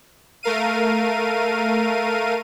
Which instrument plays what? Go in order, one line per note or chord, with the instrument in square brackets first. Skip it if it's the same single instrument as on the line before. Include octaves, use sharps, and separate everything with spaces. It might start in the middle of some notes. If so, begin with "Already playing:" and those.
[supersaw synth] A3 A#4 F5 D#7